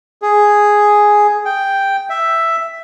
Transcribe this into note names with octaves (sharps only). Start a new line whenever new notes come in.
G#4
G5
E5